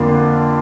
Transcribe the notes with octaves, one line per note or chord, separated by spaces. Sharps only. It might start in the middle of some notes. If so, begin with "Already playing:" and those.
Already playing: F2 D3 A#3 D4 F4